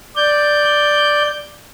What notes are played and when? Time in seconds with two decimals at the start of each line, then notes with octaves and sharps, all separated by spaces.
0.16 D5 G6